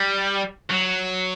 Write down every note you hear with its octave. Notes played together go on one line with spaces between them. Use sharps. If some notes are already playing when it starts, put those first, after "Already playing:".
Already playing: G3
F#3